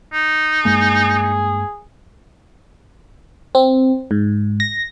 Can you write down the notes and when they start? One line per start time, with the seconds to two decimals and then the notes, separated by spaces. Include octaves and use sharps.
0.13 D#4
0.65 G2 G#3 A#3 G#4
3.55 C4
4.11 G#2
4.60 A#6